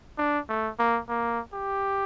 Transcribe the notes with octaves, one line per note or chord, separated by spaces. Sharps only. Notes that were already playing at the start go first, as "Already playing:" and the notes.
D4
A3
A#3
A#3
G4